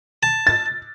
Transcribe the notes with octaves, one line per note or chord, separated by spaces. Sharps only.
A5
A6